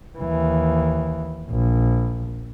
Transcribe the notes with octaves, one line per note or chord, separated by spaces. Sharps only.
D#2 E3
A#1